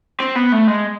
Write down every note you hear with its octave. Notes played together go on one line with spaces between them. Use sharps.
C4
B3
A3
G#3